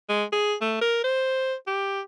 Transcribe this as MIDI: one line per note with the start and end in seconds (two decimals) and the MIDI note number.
0.09 0.24 56
0.32 0.54 68
0.61 0.81 57
0.81 1.01 70
1.04 1.54 72
1.67 2.01 67